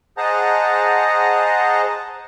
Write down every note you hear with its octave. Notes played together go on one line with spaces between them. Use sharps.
G#4 C5 D#5 F#5 A5 A#5